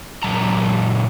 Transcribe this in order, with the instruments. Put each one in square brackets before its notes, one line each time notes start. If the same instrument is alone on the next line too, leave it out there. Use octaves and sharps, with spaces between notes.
[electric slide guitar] F#2 A#2 F#3 A5 A#5